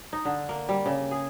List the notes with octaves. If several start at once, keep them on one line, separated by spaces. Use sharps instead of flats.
D#4
D3
A#3
G3
C#3
G#4